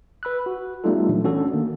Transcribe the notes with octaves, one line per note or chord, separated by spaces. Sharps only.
B4 B5 E6 F#6
F#4
G3 A3 B3 D#4 F4 A4
A#2 E3 F#3 D4
A3 C#4 D4 F#4 A4
D#3 A#3